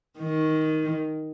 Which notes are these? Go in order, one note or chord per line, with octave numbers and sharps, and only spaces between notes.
D#3